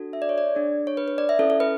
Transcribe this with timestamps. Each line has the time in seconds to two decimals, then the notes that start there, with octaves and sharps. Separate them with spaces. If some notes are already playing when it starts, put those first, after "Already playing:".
Already playing: D4 F#4 A4
0.13 E5
0.22 D5
0.29 C#5
0.38 D5
0.55 D4 G#4
0.87 C#5
0.97 B4
1.08 B4
1.18 D5
1.29 E5
1.39 C#4 E4 A4
1.50 A4
1.60 B4